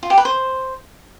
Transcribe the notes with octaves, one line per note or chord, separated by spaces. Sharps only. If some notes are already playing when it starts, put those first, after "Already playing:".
F4
G4
B4
C5